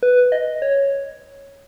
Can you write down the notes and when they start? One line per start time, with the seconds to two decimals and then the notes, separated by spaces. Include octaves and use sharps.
0.03 B4
0.32 D#5
0.62 C#5